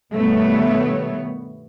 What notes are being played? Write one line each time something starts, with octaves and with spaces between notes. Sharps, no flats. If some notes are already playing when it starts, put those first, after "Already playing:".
G2 B2 D#3 A3 B3 C#5